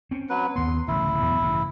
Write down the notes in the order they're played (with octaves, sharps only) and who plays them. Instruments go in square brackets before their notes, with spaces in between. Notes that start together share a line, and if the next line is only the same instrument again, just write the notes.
[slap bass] C4 C#4
[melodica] F#3 B4
[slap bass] D#2 B3 [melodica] C6
[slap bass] D1 A1 C#3 [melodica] E4
[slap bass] E2 B2 F#3
A1 G2 C#3